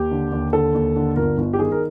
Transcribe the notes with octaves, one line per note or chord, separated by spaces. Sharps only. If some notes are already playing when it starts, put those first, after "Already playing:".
Already playing: D#2 G4
D3
D#2
D3 A4
D#2
D3
G1 A#4
G1
G4
D#3 G#4
A#4